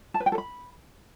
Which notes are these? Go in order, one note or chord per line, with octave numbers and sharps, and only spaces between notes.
A5
B4
G5
A4
B5